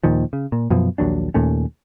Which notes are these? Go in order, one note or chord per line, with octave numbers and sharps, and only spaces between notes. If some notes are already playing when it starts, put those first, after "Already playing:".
D#2 A#2 D#3 F3
C#3
A#2
F#2 B2 F3
A#1 D#2 F#3 D4
D#2 A#2 A3 C#4